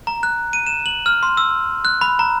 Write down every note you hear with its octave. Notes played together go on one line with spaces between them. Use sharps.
A#5
F#6
D#7
E7
F#7
F6
C6
E6
F#6
B5
A#5